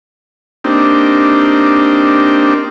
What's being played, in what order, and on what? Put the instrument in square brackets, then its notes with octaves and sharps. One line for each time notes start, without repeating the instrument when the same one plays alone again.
[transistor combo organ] A#3 C4 D4 D#4 G4